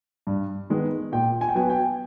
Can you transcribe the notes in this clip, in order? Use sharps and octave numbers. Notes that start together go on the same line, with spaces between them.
G2
D#3 G#3 B3
A#2 G5
G#5
G5
F#3 B3 G#5
G5